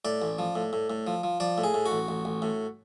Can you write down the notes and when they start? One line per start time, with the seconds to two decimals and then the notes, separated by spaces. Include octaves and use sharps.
0.05 A2 D5
0.22 A1
0.39 F3
0.55 A2
0.73 A2
0.90 A2
1.07 F3
1.24 F3
1.40 F3 D5
1.58 A2
1.64 G#4
1.74 A2
1.86 F#4
1.92 A1
2.08 A1
2.25 A1
2.42 A2